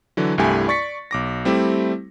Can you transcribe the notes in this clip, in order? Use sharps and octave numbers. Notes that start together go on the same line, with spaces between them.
D3 E3 F#3
C2 G2 A3 E4 G4 G#5
D5 C#6 A6 B6 C#7
B1 D6 A#6
G3 A3 C4 E4 G4